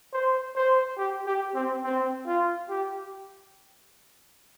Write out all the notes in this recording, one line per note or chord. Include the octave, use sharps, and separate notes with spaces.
C5
C5
G4
G4
C4
C4
F4
G4